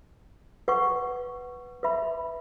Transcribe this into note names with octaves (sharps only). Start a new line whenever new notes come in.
B4 F#5 C#6
B4 E5 B5